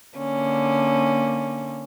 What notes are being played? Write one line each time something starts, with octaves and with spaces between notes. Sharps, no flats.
D3 A#3 C#4